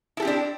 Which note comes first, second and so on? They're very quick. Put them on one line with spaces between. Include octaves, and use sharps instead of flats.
E4 A4 G4 C4 D4